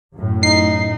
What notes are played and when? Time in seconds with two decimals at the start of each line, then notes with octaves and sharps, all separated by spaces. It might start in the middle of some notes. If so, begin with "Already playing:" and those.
0.14 F#2 A2
0.43 D#4 C7